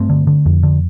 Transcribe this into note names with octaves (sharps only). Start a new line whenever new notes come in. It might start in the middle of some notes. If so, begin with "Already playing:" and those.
Already playing: G2 A3 C4
D3
D3
F2
D3